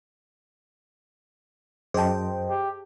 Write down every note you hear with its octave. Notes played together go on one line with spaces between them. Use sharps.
F#2 G#4 C5 D#5 G5 A5
G4